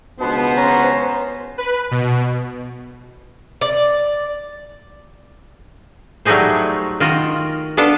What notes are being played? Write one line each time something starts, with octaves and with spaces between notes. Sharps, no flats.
C#2 B2 B3 D4 B4 C5
C#4 A#5
B4
B2
D5
F#3 G3 A3 D#4 G#4 C5
D#3 F4 F#4 D#5
B3 D4 A4 F5